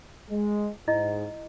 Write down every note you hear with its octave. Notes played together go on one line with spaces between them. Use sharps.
G#3
G#2 E4 D#5